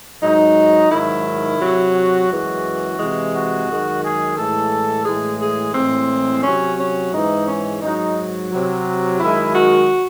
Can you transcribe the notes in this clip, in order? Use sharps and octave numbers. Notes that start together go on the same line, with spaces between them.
G#2 F#3 D#4
G#2 D#3 F#3 E4
C3 F#3
F#4
F#2 E3 G#3
C3 E3 G#3
F#4
F#2 D#3 G#3
G#4
A2 E3 G#3 A4
A2 E3 G#3 G#4
G#4
A2 E3 G#3 C4
C3 F#3 C#4
C#4
G#2 E3 G#3 D#4
C#4
G#2 F#3 D#4
C3 F#3
F#2 D#3 G#3 E4
F#4